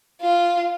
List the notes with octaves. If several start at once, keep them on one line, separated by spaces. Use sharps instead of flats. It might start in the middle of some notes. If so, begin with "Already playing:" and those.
F4